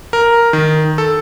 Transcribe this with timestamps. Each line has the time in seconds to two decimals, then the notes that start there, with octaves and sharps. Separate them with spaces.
0.13 A#4
0.53 D#3
0.98 A4